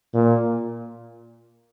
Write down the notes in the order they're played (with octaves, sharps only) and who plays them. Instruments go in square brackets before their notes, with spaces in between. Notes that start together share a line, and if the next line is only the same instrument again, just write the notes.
[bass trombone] A#2